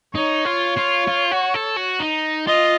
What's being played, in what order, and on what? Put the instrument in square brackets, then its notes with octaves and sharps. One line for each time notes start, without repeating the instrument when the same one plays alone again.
[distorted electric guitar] D#4 [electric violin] C#5
[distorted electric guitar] F4
F4
F4
F#4
A4
F#4
D#4
[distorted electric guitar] F4 [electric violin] D#5